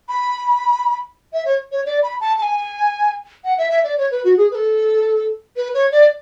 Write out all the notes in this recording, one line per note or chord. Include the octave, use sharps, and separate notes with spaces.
B5
E5
C#5
C#5
D5
B5
A5
A5
G#5
F#5
E5
E5
D5
C#5
B4
F#4
G#4
B4
A4
B4
C#5
D5